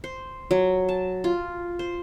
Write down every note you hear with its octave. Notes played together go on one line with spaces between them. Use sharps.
C5
F#3
A5
F4
C5